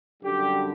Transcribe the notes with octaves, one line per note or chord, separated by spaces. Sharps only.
F#2 D3 G3 G4